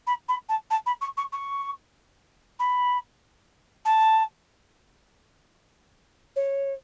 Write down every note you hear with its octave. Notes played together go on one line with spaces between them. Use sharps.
B5
B5
A5
A5
B5
C#6
C#6
C#6
B5
A5
C#5